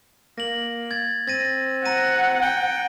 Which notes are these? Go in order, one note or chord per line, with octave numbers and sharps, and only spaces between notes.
A#3 A#6 F#7
G#6 A6
C4 A6 A#6 D#7
F#5 A#5 A#6 D#7
G5